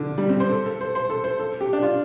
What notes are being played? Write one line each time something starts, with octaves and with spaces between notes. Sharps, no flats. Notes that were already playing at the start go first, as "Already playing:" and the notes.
Already playing: D3 F3
G3
C4
C5
A4
A4
C5
C5
A4
C5
A4
G4
D4
F4